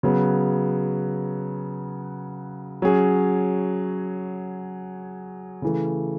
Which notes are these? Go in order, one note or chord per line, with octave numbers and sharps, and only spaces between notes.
C#3 F#3 B3
F#3 C#4 G#4
C#3 E3 A3